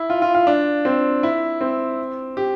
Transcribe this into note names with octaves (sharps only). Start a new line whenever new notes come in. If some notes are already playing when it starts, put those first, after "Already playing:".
Already playing: E4
F4
F4
F4
D4
C4
E4
C4
G4